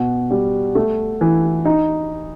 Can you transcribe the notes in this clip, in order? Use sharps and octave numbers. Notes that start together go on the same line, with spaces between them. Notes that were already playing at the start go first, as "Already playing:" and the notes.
Already playing: B2
G3
A3
E3
D#4